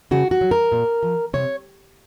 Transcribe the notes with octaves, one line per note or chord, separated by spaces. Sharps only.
C#3 F#4
F#4
F#3
A#4
A#2
F3
C3 C#5